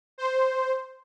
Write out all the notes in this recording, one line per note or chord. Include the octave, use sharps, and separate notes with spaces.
C5